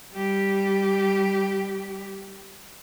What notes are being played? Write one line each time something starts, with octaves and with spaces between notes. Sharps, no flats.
G3 G4